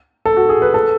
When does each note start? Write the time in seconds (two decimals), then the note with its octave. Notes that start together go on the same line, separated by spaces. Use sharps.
0.25 A4
0.37 F#4
0.49 G#4
0.62 B4
0.74 A4